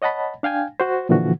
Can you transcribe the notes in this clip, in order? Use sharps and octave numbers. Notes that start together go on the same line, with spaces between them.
C#5 D#5 F#5 A5 B5
D4 F5 G5 G#5
F#4 C5
A#2 D3 E3 F3 F#4